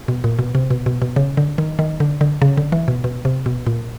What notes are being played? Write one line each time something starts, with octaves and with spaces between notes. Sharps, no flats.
B2
A#2
B2
C3
B2
B2
B2
C#3
D3
D#3
D#3
D3
D3
C#3
D3
E3
B2
B2
C3
B2
A#2